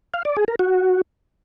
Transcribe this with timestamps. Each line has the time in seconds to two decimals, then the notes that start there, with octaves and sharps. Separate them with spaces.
0.14 F5
0.25 D5
0.36 G#4
0.48 A#4
0.59 F#4